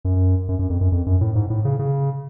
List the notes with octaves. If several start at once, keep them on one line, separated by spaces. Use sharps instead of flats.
F#2
F#2
F#2
F2
F#2
F2
F#2
A2
G#2
A2
C#3
C#3